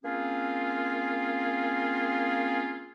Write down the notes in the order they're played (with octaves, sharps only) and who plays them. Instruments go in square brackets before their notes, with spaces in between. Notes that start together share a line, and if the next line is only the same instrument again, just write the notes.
[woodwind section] A#3 C4 C#4 F4 G#4